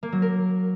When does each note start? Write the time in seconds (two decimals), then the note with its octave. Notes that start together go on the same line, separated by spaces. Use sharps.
0.03 A#3
0.12 F#3
0.22 A#4